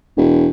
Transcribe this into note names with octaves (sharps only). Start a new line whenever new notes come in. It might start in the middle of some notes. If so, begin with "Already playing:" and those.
E1